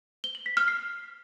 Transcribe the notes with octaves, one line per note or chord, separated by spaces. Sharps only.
G7
F#7
B6
F6
C7